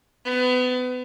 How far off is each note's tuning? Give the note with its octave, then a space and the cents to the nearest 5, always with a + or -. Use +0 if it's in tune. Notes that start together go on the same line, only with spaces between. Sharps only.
B3 +30